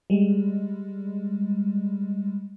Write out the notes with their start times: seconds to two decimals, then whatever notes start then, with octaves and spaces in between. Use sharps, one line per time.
0.10 G3 G#3